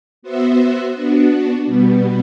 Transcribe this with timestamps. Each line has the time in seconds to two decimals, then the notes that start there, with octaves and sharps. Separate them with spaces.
0.22 B3 F#4 C5 E5
0.94 B3 D4 F#4
1.66 B2 G3 B3